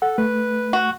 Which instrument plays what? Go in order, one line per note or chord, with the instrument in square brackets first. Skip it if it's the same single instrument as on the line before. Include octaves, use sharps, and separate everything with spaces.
[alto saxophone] A4 [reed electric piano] F#5
[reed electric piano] A3 [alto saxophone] B4
[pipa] F#4